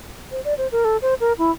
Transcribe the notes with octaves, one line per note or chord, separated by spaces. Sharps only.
C5
D5
C5
A#4
A4
C5
A#4
E4